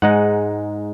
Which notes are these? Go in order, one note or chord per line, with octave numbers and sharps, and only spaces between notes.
G#2 G#3 D#4 F#5